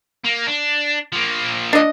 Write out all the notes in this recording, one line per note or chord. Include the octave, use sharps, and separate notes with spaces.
A#3
D4
F3 A#3
D4 D#5